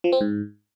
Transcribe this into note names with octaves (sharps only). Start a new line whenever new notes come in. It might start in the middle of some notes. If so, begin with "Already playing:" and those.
F3
C4
G#2